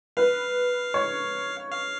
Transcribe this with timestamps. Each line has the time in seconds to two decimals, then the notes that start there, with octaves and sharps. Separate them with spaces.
0.17 B4 F5
0.94 C#5
1.72 F5